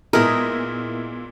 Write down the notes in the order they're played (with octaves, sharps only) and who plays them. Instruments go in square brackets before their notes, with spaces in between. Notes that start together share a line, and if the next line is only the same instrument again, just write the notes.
[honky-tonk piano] A#2 G#3 E4 [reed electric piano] B3 [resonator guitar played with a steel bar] D#4 G#4 E5 [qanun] A#4